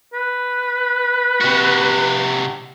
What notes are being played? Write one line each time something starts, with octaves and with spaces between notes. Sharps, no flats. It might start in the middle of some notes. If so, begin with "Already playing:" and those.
B4
C3 F#4